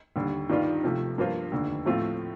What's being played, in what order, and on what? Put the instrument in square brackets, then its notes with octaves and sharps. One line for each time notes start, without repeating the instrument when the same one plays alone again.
[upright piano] D#2 D3 G3
G2 D#3 G3 D4 F4
C3 F3 A3
G2 F3 A#3 F4 C5
F1 D#2 D3
A2 F3 A3 C4 F4